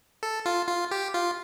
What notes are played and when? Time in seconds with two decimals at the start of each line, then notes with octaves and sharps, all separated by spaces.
0.23 A4
0.46 F4
0.68 F4
0.91 G4
1.14 F4